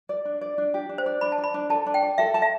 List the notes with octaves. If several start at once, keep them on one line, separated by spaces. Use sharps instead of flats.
D5
D4
D5
D4
G4
D4
C5
D5
D4 B5
A5
D5
B5
D4
A4 A5
D4
G5
D5
A4 E5
A5
E5